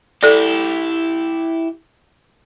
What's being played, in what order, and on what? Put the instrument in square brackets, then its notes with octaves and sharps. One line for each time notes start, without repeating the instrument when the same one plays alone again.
[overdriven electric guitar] E4 G4 [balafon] A4 D5